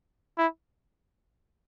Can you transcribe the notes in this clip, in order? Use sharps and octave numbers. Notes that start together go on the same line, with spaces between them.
E4